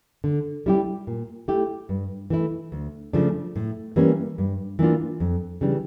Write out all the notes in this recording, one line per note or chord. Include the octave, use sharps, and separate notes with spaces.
D3
G3 C#4 E4 G4
A#2
A3 E4 G4
G2
E3 A3 E4
D2
C#3 F3 A3 D4
A2
E3 G3 A#3 C#4
G2
E3 A#3 D4 F4
F2
C#3 E3 G3 D4